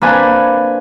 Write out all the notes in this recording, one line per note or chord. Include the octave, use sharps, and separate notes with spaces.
A#3 C4 D4 B4 G#5